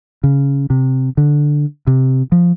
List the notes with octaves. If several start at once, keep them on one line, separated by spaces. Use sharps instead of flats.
C#3
C3
D3
C3
F3